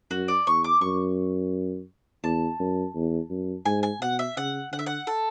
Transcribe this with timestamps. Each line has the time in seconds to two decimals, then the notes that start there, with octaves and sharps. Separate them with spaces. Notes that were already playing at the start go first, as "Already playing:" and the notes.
0.11 F#2 F#4
0.28 D5
0.47 E2 C#6
0.64 D6
0.81 F#2 C#6
2.24 E2 A5
2.60 F#2
2.95 E2
3.30 F#2
3.65 G#2 G#5
3.83 G#5
4.01 B2 F#5
4.19 E5
4.37 C#3 F#5
4.72 D3 F#5
4.79 E5
4.86 F#5
5.07 A4